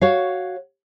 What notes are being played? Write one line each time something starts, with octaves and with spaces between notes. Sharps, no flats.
F#4 C#5 F5